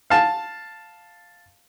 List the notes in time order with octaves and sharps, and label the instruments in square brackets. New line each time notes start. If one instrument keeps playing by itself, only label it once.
[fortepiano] F5 A5